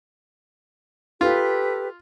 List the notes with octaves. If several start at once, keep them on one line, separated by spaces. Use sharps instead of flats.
F4 G4 A4 B4